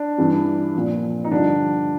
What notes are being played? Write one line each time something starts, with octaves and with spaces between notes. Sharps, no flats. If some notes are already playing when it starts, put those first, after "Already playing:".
Already playing: D4
G2 E3
A#2 F3
D#4
G2 D3 F3 D4